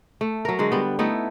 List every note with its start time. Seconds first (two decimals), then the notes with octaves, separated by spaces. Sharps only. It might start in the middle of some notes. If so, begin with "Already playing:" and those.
0.21 A3
0.45 F#3 A#4
0.59 D3 G#3 F#4
0.72 G3 B3
0.99 A3 B3 D#4 E4